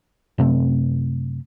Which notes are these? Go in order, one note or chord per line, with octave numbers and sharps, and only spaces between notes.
F#2 C3 A3 C4